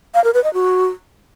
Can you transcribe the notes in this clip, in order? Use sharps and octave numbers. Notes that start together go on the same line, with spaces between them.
F5
A#4
B4
D#5
F#4